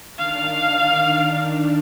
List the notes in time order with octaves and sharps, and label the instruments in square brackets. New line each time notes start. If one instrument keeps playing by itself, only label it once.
[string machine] D#3 D4 [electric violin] F5